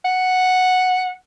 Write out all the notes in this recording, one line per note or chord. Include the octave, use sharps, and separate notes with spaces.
F#5